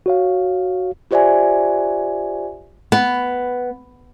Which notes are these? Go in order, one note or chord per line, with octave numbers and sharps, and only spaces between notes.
F#4 C#5 F5
F4 G4 C5 D5 E5 G#5
B3